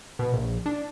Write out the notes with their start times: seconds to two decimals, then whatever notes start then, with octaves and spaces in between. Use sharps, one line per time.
0.19 B2
0.34 A#1
0.66 D4